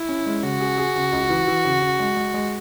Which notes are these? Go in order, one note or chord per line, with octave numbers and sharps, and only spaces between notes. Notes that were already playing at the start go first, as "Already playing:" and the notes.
Already playing: E4
C#4
G#3
C#3 F#4
G#4
G#4
C#3
C#2
E3
E3
C#3
C#3
G#3
G#3
G#3